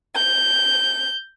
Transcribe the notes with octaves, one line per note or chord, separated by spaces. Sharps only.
G6